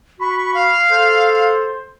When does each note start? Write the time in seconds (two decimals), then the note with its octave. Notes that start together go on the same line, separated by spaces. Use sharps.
0.20 F#4 B5 C#6
0.54 F5
0.91 A4 C5